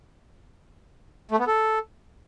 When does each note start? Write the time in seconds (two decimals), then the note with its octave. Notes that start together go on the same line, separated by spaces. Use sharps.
1.31 A3
1.39 B3
1.47 A4